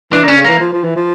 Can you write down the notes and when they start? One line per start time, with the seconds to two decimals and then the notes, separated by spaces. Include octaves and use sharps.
0.12 E3 D4
0.23 D3 A#3 C#4
0.36 C#3
0.45 E3 A#3
0.60 F3
0.72 F3
0.84 E3
0.96 F3